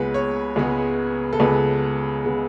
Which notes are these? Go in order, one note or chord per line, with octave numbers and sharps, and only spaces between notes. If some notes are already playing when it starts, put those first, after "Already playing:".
Already playing: C#2 C#3 G#3 B3 B4
C#5
C#2 C#3 G#3 B3
A4
C#2 C#3 G#3 B3 B4
C#3 G#3 B3